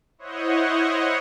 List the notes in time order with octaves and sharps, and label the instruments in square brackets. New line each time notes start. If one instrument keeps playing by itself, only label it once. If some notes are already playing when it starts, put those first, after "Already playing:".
[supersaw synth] E4 C5 C#5 D#5 F#5